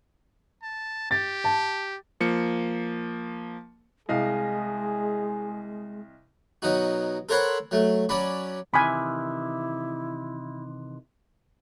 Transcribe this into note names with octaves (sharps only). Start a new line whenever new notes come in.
A5
G4 A6
A5
F3 A#3 C#7
C2 G#3 G#4 D#5 F5
B2 F#3 D#4 F#4
A4 A#4 C5 C#5 F#5 B5
F#3 A3
F#3 C#4 D5 B5
C3 D#3 E3 E4 G#5 B5